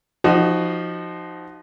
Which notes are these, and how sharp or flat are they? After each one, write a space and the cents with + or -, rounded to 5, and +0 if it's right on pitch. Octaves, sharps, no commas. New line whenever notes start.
F3 +0 D#4 +0 F#4 +25